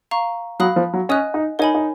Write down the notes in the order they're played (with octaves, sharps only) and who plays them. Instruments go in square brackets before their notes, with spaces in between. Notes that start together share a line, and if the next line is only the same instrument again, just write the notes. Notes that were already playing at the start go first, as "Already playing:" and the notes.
[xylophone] F5 A#5 C#6
[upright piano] F#3 [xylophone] F5 B5 D#6 F#6
[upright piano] F3
F#3
[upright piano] C#4 [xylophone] D#5 G#5 D#6 F#6
[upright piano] D#4
[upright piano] D#4 [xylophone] A#4 C#5 G#5 B5
[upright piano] D#4